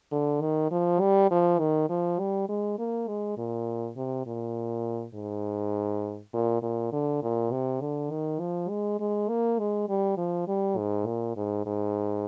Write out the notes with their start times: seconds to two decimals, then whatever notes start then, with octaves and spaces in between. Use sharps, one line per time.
0.12 D3
0.41 D#3
0.71 F3
1.00 G3
1.31 F3
1.59 D#3
1.89 F3
2.19 G3
2.49 G#3
2.78 A#3
3.08 G#3
3.37 A#2
3.96 C3
4.26 A#2
5.14 G#2
6.33 A#2
6.62 A#2
6.92 D3
7.22 A#2
7.52 C3
7.81 D3
8.11 D#3
8.40 F3
8.69 G#3
8.99 G#3
9.29 A#3
9.59 G#3
9.89 G3
10.17 F3
10.48 G3
10.77 G#2
11.06 A#2
11.36 G#2
11.66 G#2